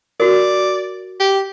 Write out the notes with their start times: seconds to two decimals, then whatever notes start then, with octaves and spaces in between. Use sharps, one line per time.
0.20 F#4 A#4 D5
1.20 G4